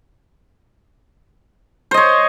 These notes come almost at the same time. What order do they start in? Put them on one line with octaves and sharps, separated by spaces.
C5 D#5 C#5